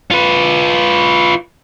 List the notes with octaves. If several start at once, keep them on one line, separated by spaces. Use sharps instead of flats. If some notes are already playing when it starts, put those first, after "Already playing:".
F4 B4